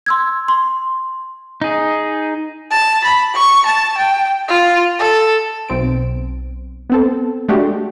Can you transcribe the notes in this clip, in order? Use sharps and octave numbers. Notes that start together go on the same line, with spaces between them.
C6 E6 G#6
C6
D#4 G#4
A5
B5
C#6
A5
G5
F4
A4
B1 C4 D7
B3 C4 A4
G#3 A3 D4 F#4 G4